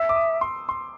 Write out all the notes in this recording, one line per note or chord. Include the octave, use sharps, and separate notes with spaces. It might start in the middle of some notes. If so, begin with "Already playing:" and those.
Already playing: E5 E6
D6
D#6
C6
C6